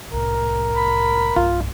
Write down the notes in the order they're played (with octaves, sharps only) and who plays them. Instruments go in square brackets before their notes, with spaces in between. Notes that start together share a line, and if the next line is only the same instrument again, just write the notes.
[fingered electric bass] C2 A2 [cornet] A#4
[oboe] B5
[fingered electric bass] B1 G2 A3 [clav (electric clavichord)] F4